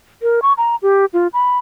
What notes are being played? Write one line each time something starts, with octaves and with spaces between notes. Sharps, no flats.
A#4
C#6
A#5
G4
F4
B5